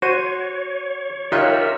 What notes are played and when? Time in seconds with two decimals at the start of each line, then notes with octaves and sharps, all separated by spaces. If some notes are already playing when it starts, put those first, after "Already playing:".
0.02 F#4 C5 C#5 D#7
1.32 D#4 F4 G4 A#4 C#5 E5 F#6